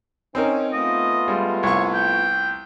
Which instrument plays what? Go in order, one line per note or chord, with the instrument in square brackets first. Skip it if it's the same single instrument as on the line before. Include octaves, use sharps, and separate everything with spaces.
[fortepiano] C4 D#4 A#4 [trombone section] C#4
[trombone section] A3 B3 F4 [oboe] D#5
[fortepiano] G3 G#3
[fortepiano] C2 C#6 [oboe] C#5
[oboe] G5